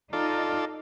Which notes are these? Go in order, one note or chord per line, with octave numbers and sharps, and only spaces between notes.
D#4 F4 A4 D5